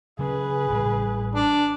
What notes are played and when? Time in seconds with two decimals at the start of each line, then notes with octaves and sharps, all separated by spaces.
0.19 C#3 F#3 C#4 G#4 B4
0.70 A1 A2 G3
1.35 D4